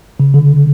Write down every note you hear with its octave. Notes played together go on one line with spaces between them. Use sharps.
C#3
D3